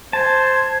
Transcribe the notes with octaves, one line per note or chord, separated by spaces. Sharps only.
C5 A5 G#6